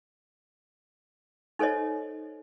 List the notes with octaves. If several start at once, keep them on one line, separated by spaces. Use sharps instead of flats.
D#4 A4 C5 C#5 D#5